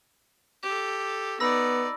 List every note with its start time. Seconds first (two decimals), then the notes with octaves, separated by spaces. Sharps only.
0.63 G4 A4
1.40 B3 D#4 D5 B5 E6 A#6